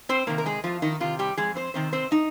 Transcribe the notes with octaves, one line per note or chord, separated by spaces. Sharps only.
C4 C5
C3 D#3 A#3 A#4
A#4
G#3 G#4
F2 F3 F4
D#3 D#4
C3 D#3 F4
G3 G4
F2 G#3 G#4
C4 C5
C3 D#3 C4 C5
C4 C5
D#4 D#5